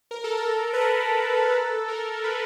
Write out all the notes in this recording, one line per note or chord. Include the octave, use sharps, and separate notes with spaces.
A#4
A4
A#4
B4
A#4
A4
A#4
B4